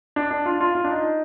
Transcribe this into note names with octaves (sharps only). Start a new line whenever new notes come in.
D4
D4
F4
F4
F4
D4
D#4